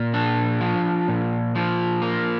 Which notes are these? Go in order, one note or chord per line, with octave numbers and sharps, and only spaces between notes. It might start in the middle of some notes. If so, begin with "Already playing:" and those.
Already playing: A#2
D4
F3
A#2
F3
A#3